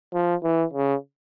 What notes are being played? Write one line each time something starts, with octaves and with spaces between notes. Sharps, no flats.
F3
E3
C#3